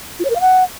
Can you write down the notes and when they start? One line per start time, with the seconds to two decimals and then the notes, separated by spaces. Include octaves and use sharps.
0.19 F4
0.25 C#5
0.30 A#4
0.35 F5
0.41 F#5